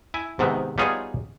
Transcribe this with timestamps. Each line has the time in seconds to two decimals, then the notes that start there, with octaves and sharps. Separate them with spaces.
0.14 E4 G#5
0.39 G#2 C3 D#3 B3
0.78 G3 B3 D#4 F4 G#4 C#5